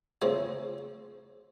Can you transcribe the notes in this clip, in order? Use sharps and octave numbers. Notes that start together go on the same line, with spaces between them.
F#2 C#3 F3 A3 C4 C#5 D#5